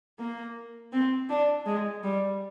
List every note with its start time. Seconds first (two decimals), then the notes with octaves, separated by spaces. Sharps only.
0.19 A#3
0.92 C4
1.29 D4
1.66 G#3
2.03 G3